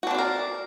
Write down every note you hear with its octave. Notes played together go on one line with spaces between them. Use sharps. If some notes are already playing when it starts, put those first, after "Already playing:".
C4 D4 F#4 A#4 D5